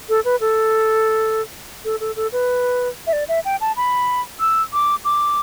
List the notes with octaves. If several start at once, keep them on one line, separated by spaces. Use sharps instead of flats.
A4
B4
A4
A4
A4
A4
B4
E5
D5
E5
G5
A5
B5
E6
D6
D6